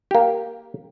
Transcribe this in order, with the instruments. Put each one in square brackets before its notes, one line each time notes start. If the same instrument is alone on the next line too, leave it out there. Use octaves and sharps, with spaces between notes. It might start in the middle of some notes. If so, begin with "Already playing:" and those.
[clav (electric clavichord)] A#3 G4